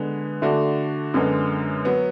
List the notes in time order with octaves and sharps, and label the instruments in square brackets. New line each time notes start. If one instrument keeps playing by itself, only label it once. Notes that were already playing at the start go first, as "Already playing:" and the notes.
Already playing: [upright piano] D3 G#3 B3
D3 A3 D4 F#4
F#2 D3 G#3 B3
F#3 B3